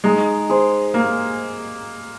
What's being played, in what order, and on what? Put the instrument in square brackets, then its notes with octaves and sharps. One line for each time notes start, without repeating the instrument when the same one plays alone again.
[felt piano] G#3 [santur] D#4
[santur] G#4 C5
[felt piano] A#3